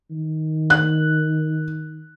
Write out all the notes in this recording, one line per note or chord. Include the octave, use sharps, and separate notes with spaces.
D#3
F#6